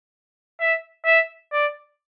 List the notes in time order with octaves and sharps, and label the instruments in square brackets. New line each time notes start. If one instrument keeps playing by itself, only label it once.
[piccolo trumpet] E5
E5
D5